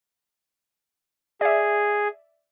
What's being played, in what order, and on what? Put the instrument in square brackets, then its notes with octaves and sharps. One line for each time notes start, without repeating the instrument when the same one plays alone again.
[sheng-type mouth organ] G#4 [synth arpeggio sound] D5 E5